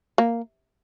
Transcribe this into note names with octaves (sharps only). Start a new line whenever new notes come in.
A#3